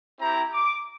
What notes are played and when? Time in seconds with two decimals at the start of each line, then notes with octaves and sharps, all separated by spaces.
0.19 C4 E4 G4 A#5
0.52 D6